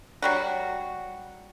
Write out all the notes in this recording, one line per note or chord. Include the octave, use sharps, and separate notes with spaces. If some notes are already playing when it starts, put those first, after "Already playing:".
F#3 G3 F#4